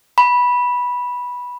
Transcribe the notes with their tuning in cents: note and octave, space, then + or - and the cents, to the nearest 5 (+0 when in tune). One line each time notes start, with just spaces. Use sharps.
B5 -10